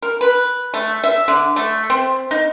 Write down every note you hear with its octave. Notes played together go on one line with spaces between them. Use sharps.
A#4
B4
A3
E5
D3
A3
C4
D#4